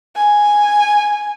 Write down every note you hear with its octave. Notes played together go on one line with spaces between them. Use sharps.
G#5